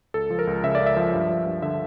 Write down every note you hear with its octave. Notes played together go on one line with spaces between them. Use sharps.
C#2 A4
F3
A#4
C#2
C#3 E5
D5
C#2
E5
F3
G2
F3
G2
D3 E5